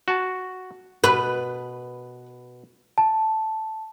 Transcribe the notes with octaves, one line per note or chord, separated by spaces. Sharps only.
F#4 A5
B2 B4
A5